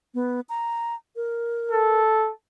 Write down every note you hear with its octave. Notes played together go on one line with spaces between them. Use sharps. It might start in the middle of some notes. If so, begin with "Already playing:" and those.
B3
A#5
A#4
A4